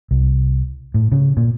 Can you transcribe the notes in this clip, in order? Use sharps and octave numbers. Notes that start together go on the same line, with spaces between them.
C2
A2
C#3
A#2